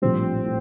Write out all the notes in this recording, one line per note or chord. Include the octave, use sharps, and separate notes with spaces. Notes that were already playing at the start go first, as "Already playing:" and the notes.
A#1 A2 G3 C4
A2